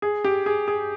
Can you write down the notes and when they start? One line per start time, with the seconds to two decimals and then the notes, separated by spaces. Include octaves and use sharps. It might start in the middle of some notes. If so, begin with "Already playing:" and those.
0.02 G#4
0.24 G4
0.46 G#4
0.68 G#4